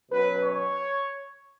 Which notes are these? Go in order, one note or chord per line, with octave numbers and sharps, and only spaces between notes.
B2 F#3 C#4 B4
C#5